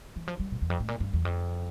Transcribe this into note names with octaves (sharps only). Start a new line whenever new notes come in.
E3
F3
G3
A#2
E2
F2
A2
A#2
G2
E2
F2